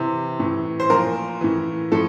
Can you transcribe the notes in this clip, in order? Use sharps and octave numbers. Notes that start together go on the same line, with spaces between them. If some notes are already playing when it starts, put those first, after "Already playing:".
Already playing: C3 E3
A2 E3
C5
A#2 F3 A#4
A2 E3
A2 F3 A4